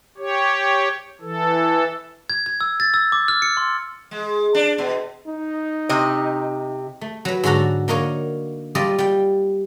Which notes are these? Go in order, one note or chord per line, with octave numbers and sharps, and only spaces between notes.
G4 C#5
E3 A4
G#6
G#6
E6
A6
E6
D6
F6
C#7
C6
G#3
D4
B2
D#4
C3 D#5
A3
F#3 B4
G#2 D3 F#4 A4 A#5
D3 A#3 D#4 A#4 C#5
G3 F4 A4 D5 D#5
G3 G5